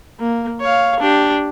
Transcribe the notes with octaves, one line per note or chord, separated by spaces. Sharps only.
A#3
C#5 F5
D4 G4